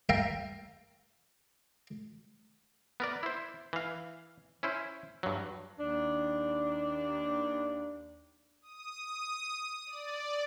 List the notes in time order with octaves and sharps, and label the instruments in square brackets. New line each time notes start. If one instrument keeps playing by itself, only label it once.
[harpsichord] A#4 E5 F5 G5 A5
[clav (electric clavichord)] B3 A#4 D5
E4 C5
E3 F5
C#4 E4 C5
G2 F#3
[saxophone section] D#2 D4
[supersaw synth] D#6
D5